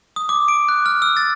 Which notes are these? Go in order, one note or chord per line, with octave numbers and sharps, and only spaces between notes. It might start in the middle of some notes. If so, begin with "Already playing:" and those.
D#6
D6
D7
F#6
F6
E6
A6